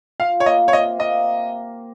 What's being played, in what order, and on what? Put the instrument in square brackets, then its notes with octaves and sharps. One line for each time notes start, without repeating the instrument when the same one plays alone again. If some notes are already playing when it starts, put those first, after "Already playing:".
[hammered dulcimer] F4 [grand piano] F5
[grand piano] C#5
[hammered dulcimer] A#3 [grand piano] D#5
[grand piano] C#5
[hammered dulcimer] C3 [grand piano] D#5
[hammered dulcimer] A#3 [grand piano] D#5